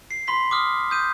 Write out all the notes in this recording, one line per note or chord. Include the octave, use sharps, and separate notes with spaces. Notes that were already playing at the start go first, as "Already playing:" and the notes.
C7
B5 C6 B6
D6 D#6 F6
D#6 G6 D#7